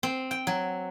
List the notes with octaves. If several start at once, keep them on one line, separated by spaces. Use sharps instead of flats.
C4
G5
F#3